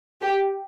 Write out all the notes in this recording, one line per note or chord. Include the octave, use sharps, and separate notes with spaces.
G4